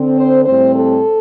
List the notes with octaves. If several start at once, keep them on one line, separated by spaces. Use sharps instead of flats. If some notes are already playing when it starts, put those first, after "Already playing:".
Already playing: D3 C4
C5
A2 G3 C4 C5
A4